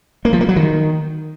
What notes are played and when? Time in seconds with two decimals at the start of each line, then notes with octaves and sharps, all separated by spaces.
0.25 A#3
0.33 F3
0.41 A#3
0.49 F#3
0.56 D#3